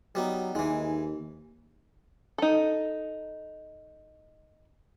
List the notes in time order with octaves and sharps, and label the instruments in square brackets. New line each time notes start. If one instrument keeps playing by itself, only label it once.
[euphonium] F#3 [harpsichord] G3 B3 D#4
[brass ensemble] D#2 [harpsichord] E3 G#3 [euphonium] D#4
[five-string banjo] D#4 A4